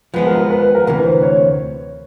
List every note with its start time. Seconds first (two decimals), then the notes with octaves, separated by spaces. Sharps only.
0.14 F3 G#3 B3 B4
0.27 A#4
0.38 A#4
0.51 B4
0.62 B4
0.75 A#4
0.87 D2 C3 E3 B4
1.04 C5
1.23 C#5